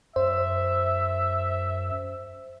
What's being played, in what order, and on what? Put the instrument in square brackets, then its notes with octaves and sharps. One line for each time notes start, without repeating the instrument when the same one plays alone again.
[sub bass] F#2 [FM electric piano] C5 [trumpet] E5